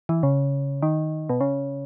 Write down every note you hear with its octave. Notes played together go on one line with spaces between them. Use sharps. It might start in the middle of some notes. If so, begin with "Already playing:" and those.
E3
C#3
D#3
B2
C#3